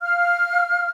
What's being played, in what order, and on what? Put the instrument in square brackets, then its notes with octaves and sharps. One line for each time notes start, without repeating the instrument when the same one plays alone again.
[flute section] F5 F6